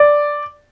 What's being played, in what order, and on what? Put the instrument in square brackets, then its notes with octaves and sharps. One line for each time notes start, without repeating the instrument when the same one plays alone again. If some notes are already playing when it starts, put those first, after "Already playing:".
Already playing: [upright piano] D5